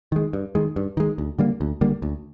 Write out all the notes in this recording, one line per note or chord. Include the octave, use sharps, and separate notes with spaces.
D#3 G#3
G2
D#3 G#3
G2
D#3 G#3
D2
D3 G3 A#3
D2
D3 G3 A#3
D2